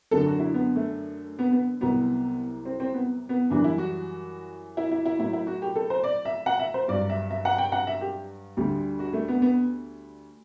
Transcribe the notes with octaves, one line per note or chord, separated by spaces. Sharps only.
F#2 D3 F#3 A4
F#4
E4
B3
A3
B3
B3
C2 C3 F#3 B3
C4
C4
B3
B3
F#2 E3 G3 D4
E4
F#4
E4
E4
E4
A2 F#3 E4
E4
F#4
G4
A4
C5
D5
E5
F#5
E5
C5
G2 F#3 D5
E5
E5
F#5
G5
F#5
E5
G4
D2 D3 G3
F#4
A3
B3
B3